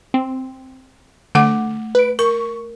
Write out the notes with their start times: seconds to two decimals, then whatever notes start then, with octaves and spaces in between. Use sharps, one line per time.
0.14 C4
1.35 D3 A3 F#5 D6
1.95 B4 D7
2.19 A#4 C#6